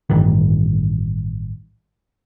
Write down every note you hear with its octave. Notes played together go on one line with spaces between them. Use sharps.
A1 G2 D#3 E3